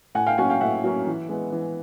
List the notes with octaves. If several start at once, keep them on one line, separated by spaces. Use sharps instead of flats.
A2 F#5 G#5
F5 G5
F#3 A#3 C#4 F#5 G#5
F5 G5
A2 E5 F#5
F#3 A#3 C#4
E3
G#3 B3
E3